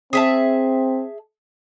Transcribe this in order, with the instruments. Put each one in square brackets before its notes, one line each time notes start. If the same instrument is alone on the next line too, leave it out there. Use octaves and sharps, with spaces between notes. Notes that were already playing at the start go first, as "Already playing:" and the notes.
[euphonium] C4 [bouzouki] G#4 E5 A5